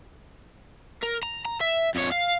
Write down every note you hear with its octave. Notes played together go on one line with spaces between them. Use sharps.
A#4
A#5
A#5
E5
F2 C#5
F5